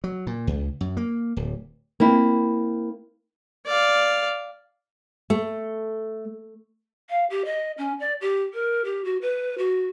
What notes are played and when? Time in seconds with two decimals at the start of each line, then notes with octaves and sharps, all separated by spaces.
0.04 F#3
0.27 A#2
0.47 C#2
0.81 F#2
0.97 A#3
1.37 D1
2.00 A#3 C4 E4
3.66 D5 F5
5.30 A3
7.10 F5
7.30 G4
7.45 D#5
7.78 C#4
8.00 D5
8.21 G4
8.54 A#4
8.85 G4
9.04 F#4
9.21 B4
9.58 F#4